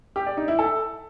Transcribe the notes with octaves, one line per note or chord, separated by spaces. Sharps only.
G4
D5
D#4
E4
A4